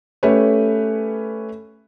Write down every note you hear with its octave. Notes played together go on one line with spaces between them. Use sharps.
A3 C#4 G4 A4 B4 C#5